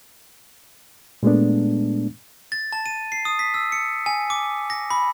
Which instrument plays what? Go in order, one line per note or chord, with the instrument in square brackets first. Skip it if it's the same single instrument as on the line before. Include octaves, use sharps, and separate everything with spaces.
[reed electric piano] A#2 G#3 A3 B3 D4
[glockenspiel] A6
A5
D#7
C7
D#6
B6
E6
C#7
G#5
D6
A#6
B5